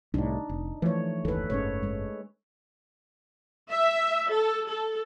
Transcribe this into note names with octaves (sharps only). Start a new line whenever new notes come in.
C2 A2 D4 D#4
F1
E3 F3 A3 C#5
F#1 D#2 E3 A4 B4
F#1 G#2 C#4 C#5
G#3
E5
A4
A4